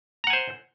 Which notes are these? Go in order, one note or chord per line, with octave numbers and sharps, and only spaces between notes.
C5 F#5 G#5 A#5